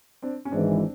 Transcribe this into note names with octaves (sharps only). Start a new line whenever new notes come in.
C4 D4
C#4
G#1 G#2 E3 G#3 C4 D4